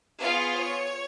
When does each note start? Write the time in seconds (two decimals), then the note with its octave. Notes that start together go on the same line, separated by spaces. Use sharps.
0.21 B3 F4 G#4 F5
0.57 C#5